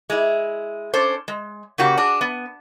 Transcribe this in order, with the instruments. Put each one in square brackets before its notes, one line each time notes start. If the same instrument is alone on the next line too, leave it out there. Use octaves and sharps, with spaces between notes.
[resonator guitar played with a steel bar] G#3 E4
C#4 D4 A4 C5
G#3
C#3 A#3 F#4 G4
D4 F#4 G#4
B3